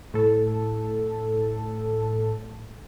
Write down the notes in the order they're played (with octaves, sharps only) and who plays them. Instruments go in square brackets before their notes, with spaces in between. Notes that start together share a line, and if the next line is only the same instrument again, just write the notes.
[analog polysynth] A2 A4